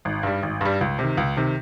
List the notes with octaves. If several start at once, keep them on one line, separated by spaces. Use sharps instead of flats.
G#1
G2 G3
G#1
G2 G3
C#2
C3 D#3
C#2
C3 D#3